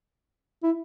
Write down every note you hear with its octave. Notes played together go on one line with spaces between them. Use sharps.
E4